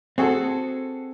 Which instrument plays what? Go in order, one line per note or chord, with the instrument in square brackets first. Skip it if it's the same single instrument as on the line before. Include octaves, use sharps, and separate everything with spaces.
[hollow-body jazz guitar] C4 [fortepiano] F#4 G#4 A4